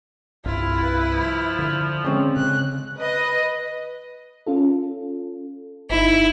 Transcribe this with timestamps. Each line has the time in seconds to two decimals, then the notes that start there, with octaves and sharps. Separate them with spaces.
0.46 C2 G2 E4 F4
0.83 B4
1.11 F3
1.59 D3
2.04 D3 G#3 C4 C#4
2.36 C#3 F#6
2.99 B4 D#5
4.47 C#4 F4 A4
5.90 G1 D#4 E4